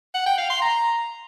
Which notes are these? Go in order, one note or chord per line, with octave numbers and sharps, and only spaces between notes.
F#5
G5
F5
C6
A#5